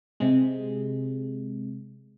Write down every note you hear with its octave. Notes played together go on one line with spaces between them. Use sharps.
C3 G#3